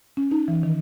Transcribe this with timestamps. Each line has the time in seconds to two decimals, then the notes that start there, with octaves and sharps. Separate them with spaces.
0.17 C#4
0.31 D#4
0.48 E3
0.63 D#3